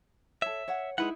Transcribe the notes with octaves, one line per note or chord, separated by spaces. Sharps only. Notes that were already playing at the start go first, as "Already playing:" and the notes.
A4 C#5 E5
C#5 F#5
G#3 D#4 E4 B4 F#5